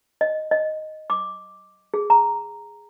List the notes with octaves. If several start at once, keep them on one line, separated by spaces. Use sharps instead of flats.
D#5
D#5
D6
G#4
A#5